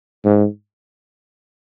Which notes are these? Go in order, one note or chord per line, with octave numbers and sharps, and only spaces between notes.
G#2